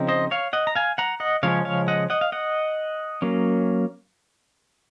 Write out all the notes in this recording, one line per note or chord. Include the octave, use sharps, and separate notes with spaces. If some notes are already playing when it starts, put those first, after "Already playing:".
Already playing: C#3 F3 C4 D#4
C5 D#5
C#5 F5
D#5 F#5
A#5
F5 G#5
F#5 A#5
D#5 F#5
C#3 F3 G#3 C#4 C#5 F5
C#5 F5
D#5 F#5
D#5 F#5
F5
D#5 F#5
F#3 A#3 C#4